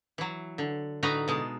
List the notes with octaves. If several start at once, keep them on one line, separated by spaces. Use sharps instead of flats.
E3 F#3
D3
A2 D3 D#4 F#4 B4 A#5
B2 G#3 A5